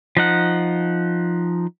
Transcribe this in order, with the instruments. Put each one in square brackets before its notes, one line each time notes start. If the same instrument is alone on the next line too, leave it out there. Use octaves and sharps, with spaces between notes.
[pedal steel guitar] F3 D#4 F#5